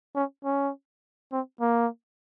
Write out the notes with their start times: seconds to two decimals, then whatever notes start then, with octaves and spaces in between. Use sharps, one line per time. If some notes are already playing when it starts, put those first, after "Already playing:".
0.15 C#4
0.44 C#4
1.32 C4
1.61 A#3